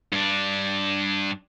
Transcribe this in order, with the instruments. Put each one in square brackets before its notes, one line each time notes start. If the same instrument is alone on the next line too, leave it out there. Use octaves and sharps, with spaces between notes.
[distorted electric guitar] G2 D4